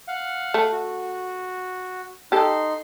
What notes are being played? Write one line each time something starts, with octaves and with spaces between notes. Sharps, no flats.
F5 F#5
A3
F#4
D#4 G4 A4 C6